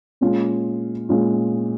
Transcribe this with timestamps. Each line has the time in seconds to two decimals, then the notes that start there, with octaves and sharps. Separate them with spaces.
0.21 A#2 G#3 C#4 F4
1.09 A#2 G#3 C#4 F4